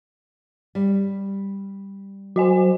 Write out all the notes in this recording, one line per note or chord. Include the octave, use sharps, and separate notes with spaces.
G3
F#3 F#4 C5 D#5 G#5